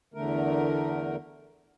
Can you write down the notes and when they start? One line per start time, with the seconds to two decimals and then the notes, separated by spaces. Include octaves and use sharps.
0.14 E2 D3 A3 A#4